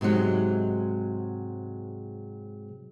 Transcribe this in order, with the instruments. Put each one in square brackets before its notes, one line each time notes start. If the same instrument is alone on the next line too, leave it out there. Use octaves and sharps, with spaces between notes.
[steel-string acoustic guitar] G#2 C3 F3 F#3 G#3